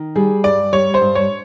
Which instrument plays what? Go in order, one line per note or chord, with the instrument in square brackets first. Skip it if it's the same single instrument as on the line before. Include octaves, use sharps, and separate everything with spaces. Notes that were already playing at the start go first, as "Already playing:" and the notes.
Already playing: [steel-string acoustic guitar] D#3
[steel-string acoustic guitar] G3 [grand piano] G#4
[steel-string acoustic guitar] G2 [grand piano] D5
[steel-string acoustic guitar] G3 [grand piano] C#5
[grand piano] C5
[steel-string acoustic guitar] G2
[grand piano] C#5